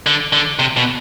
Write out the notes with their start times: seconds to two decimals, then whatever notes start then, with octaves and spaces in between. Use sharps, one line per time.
0.06 D3
0.33 D3
0.59 C3
0.77 B2